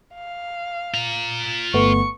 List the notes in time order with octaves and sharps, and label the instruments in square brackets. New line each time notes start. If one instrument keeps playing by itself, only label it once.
[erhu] F5
[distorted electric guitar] F4 A#5
[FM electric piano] G1 A3 B3 [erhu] C#6